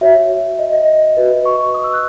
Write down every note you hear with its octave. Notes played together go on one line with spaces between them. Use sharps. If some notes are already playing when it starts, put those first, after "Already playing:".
F#4 C#5 E5
D#5
D#5
F#4 B4
C#6
D#6
E6
F#6